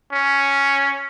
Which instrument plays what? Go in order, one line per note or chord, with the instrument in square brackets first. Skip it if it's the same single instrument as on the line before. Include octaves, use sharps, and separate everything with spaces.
[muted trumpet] C#4